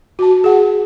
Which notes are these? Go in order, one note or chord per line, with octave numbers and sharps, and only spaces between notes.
F#4 A5
G#4 F#5